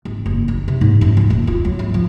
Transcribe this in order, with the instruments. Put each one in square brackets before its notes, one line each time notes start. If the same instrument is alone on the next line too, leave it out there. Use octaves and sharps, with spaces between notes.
[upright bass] G#1
F#1
D#4
C3
G#2
F#2
F3
D#1
F4
F#3
G#1
F3